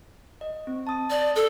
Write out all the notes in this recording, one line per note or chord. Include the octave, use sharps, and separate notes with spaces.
D#5
C4
A5 D#6
D5
A4